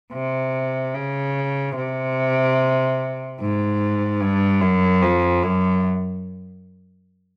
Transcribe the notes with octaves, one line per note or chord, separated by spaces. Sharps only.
C3
C#3
C3
G#2
G2
F#2
F2
F#2